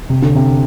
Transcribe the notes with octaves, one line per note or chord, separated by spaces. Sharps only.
C3
D3
C3